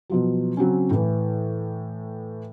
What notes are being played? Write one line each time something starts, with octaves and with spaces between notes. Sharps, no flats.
B2 F3 F#3
C#3 F#3 C4 C#4
A2 E3